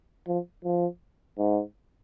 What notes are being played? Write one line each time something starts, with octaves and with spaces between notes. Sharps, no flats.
F3
F3
G#2